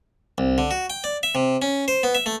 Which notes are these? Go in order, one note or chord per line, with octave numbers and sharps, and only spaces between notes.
C2
D3
F#4
G5
D5
E5
C3
C#4
C5
B3
E5
A3